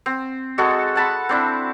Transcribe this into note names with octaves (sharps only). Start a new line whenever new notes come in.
C4
G#3 F#4 G#4 A4
F#5 A5 B5
C4 D4 E4